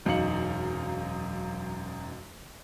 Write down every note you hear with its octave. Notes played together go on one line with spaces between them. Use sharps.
E1 F#2 D#4 F5 C#7 F#7